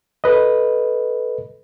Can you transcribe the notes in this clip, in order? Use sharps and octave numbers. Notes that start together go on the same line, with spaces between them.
A4 B4 D#5